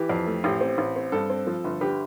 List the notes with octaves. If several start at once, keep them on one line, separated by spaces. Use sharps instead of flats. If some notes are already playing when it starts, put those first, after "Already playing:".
Already playing: E3 G4
F2
A3
A1 G4
C4
A1
C4
G2 A4
C4
F3
G1
D3 G4 B4